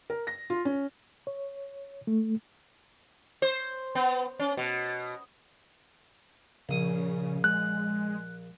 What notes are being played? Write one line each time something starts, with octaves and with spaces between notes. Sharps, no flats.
A#4
A#6
F4
C#4
C#5
A3
C5
B3
C#4
B2
A#1 C#3 D#6
G#3 F#6